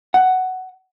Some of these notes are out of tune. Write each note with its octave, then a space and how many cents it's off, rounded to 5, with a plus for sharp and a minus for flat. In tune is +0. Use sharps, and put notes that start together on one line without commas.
F#5 +10